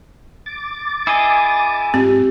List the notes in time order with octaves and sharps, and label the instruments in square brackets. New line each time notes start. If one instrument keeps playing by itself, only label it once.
[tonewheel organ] D6 A6
[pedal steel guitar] E4 G#4 D#5 [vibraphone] G#5
[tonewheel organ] G#2 [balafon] C4 [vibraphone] F4 G4